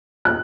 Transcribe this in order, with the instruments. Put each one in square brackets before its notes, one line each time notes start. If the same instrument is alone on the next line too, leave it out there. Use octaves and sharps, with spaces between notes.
[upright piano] F#6